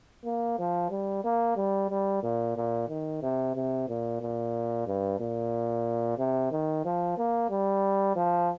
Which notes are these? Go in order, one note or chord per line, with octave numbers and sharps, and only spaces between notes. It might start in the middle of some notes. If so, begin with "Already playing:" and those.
A#3
F3
G3
A#3
G3
G3
A#2
A#2
D#3
C3
C3
A#2
A#2
G2
A#2
C3
D#3
F3
A#3
G3
F3